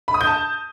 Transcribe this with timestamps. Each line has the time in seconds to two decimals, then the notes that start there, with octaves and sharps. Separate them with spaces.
0.08 B5
0.14 D#6
0.21 G6
0.27 A5